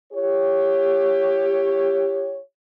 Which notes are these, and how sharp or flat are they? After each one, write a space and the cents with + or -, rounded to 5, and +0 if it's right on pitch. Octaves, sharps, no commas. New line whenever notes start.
E4 +45 G4 +15 C#5 +0